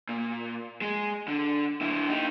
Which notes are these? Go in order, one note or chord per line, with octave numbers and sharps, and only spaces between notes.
A#2
G#3
D3
D3 E4
D#4 G4